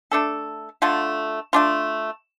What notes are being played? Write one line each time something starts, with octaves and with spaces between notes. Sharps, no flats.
A3 D4 A4
D3 A3 F4
A3 D4 F4